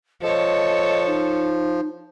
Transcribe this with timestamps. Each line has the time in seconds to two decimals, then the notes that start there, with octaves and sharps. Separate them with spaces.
0.22 F3 A4 C#5 D#5
1.06 D#4